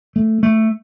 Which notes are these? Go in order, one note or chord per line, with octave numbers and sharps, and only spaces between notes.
A3
A3